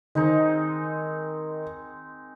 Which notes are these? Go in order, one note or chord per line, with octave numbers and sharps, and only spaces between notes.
D#3 G#3 C4 D#4